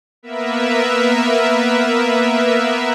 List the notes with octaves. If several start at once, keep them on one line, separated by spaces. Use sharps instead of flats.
A#3 B3 A#4 B4 E5